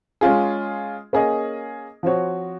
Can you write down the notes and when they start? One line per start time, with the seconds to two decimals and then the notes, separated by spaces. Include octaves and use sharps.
0.21 G#3 C#4 F4 G#4
1.13 A#3 C#4 G#4 D#5
2.03 F3 C4 F#4 C#5